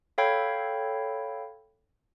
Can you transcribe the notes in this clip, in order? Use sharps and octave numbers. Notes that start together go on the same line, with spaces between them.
A4 C#5 F5 G5 B5 G#6